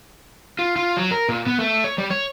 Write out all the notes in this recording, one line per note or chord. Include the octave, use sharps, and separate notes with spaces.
F4
F4
F#3
A#4
A#2
B3
A3
C#5
G3
C#5